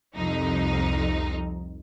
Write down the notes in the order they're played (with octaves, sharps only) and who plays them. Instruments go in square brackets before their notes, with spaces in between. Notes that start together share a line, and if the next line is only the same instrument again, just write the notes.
[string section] C2 F2 D#4